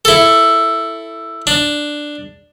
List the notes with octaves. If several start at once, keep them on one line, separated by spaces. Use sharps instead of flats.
E4 A4
D4